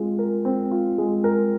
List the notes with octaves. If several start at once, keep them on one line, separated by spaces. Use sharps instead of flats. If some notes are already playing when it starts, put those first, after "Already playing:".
Already playing: G#3 C4 F4
A#4
C4
F4
G#3
A#4